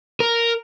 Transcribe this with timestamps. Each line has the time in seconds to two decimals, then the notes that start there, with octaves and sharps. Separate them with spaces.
0.20 A#4